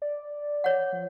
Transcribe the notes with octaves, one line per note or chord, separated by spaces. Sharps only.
D5
C#5 F#5
F3